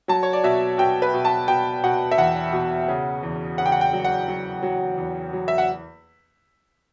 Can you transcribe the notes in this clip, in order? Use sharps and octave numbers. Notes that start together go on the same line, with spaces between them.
F#3 A5
C#5
D5
B2 E5
B2 G5
B4
B2
A5
B2 G5
B2 F#5
E5
E2 F#5
B2
C#3
E2
C#3 F#5
G5
F#5
G5
F#3
F#5
F#3
F#3
E2
F#3
E5
F#5